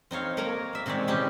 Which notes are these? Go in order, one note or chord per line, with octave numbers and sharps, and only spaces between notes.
C4 D#4 C#5 F5
A#3 A#4 C#5 A#5
F4 E5
C3 D#3 G#3 C#5 D5
A#2 E3 C#4 D#4 G4 G#4